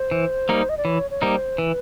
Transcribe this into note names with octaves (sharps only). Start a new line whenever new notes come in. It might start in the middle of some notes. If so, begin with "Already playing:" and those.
Already playing: C5
E3
G3 A#3 D#4
D#5
D5
E3 C#5
C#5
G3 A#3 D#4 C5
E3 B4